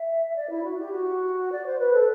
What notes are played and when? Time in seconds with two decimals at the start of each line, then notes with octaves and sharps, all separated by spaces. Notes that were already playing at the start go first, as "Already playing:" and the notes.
Already playing: E5
0.36 D5
0.50 E4
0.64 F#4
0.79 G4
0.92 F#4
1.52 D5
1.66 C5
1.79 B4
1.94 A4